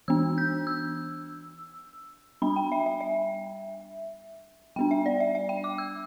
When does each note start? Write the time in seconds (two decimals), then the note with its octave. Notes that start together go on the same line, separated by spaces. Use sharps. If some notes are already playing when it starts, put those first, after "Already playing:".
0.08 E3 B3 D4 E6
0.38 G6
0.67 E6
2.42 G3 B3 D4 B5
2.56 G5
2.72 E5
2.86 E5
3.01 E5
4.76 G3 B3 D4 G5
4.91 E5
5.06 D5
5.20 E5
5.35 E5
5.49 G5
5.64 D6
5.78 E6